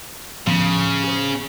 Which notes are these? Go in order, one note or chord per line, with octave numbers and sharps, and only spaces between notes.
D2 A2 C#3 F3 B3 C#4
G#4 C5